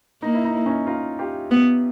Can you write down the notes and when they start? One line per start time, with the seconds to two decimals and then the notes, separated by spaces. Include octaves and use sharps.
0.22 A#3 D#4
0.34 E4
0.44 D#4
0.55 E4
0.66 C#4 D#4
0.86 D#4 F4
1.19 F4 G4
1.51 B3